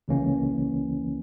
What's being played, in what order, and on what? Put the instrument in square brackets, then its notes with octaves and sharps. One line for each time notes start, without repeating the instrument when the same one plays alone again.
[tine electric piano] C#2 C#3 E3 A#3 C#4